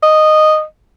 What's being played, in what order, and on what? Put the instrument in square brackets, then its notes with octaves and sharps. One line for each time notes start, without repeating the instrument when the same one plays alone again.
[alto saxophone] D#5